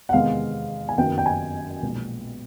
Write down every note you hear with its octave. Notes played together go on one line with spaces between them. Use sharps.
F#5
E2 C3 D#3 G#3 F5
G#5
F#1 F#2 D#3 F#3 B3 G5
G5
G#5
B1 A#2 F3 G#3 B3